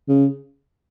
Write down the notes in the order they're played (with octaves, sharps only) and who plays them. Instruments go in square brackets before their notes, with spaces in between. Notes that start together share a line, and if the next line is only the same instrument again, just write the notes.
[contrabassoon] C#3